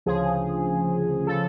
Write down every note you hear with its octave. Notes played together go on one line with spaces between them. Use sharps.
D2 C#3 F3 G#4
C#3 F3 A4